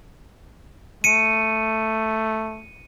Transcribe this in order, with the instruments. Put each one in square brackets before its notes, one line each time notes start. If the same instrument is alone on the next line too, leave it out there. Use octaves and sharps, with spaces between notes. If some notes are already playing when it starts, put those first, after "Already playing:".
[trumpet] A3 [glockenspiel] C#7 D#7